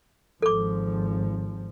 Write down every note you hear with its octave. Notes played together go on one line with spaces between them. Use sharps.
G#1 F3 A4 D6